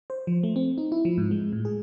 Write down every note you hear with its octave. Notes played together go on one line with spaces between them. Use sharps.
C5
F3
A3
C4
D#4
E4
F3
G#2
G#3
A2
G#4